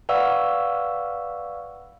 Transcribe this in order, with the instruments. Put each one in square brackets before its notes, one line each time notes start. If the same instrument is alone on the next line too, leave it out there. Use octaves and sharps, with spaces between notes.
[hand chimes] B4 D5 F5 F#5 C#6 E6